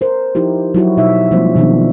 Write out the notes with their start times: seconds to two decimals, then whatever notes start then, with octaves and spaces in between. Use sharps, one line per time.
0.01 A#4 C5
0.35 F3 D#4 E4 G4
0.75 F#3 E4 F#4
0.97 B2 D#4 E5
1.31 F3 G3 G#3 A#3 C4 C5
1.56 B2 D#3 F3 B3 D4 D#4